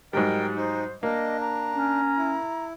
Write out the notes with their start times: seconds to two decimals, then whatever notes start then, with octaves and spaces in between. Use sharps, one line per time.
0.13 G#2 F#3 G3 A#4 D#5 G5
0.56 D#4 C5
1.03 A#3 D4 D#5
1.41 A#5
1.74 C#4
2.18 E4